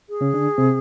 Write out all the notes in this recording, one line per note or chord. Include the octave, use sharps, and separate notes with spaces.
G#4
C#3 C#4
D3 D4
C3 C4